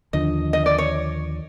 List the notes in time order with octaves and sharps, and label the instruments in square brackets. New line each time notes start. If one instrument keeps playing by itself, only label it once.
[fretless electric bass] D#2 D3 F3 [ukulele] D#5
[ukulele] D#5
D5
C#5